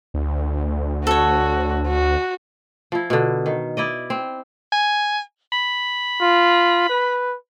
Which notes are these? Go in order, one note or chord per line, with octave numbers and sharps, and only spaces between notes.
D2
F#4 A4 C#5
F#4
F3 E4
B2 D3
D#3
E4 D5 D#5
C4
G#5
B5
F4
B4